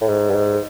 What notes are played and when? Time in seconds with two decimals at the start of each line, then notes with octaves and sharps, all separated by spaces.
0.01 A2
0.08 G#2
0.30 G2
0.35 G#2